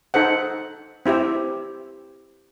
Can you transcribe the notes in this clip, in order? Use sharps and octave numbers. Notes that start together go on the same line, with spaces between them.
D#4 A4 C5 F#5
C4 E4 G4 E5